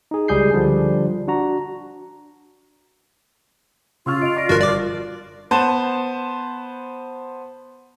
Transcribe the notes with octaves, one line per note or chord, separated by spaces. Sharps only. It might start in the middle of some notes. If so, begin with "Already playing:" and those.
D#4 G#4
C#2 G3 G#4 G6 C7
D3 F3 G3 D4
D4 F#4 A#5
C#3 F4 C6 C#6 E6 F6
D#5 D7 F7
D5 C#6 A#6 D7
G1 F#4 A#4 A5 F#6 A#6
D5 D6
B3 C5 A5